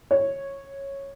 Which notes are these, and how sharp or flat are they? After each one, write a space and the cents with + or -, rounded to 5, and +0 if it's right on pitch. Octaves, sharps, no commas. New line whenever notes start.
C#5 -10